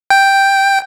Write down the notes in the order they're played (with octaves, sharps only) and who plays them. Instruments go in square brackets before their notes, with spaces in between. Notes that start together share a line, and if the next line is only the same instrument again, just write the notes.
[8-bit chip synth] G5